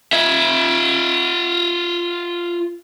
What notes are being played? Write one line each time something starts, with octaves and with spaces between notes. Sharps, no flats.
F4 E5